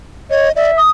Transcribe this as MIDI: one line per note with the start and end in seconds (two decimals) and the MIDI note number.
0.30 0.49 73
0.30 0.52 75
0.56 0.71 74
0.56 0.78 76
0.77 0.90 87